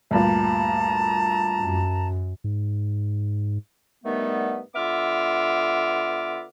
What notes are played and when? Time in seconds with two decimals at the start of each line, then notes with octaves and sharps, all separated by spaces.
0.11 D2 G2 A#2 A5 A#5
1.60 F#2
2.44 G#2
4.05 G2 D#3 G3 A3 B3
4.75 D3 B3 F4 E5 D6 F6